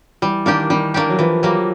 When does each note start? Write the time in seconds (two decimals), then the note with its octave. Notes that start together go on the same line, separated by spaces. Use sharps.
0.22 E3 G3
0.46 D#3 A#3 D4 G4
0.70 D#3 G3
0.94 A#3 D4 G4
1.10 F#3
1.18 E3 F3
1.43 F#3 G3 A#3